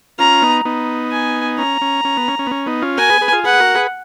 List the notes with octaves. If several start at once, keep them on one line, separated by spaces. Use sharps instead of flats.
C#4 F4 A#5
B3 D#4
B3 D#4
G#5
C#4 A#5
C#4
C#4
B3
C#4
C#4
B3
C#4
B3 D#4
C#4 F4
F#4 A#4 G#5
G#4 B4
G#4 B4
F4 G#4
G#4 B4 F#5
F#4 A#4
G#4 B4